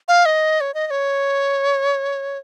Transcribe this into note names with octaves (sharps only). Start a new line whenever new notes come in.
F5
D#5
C#5
D#5
D#5
C#5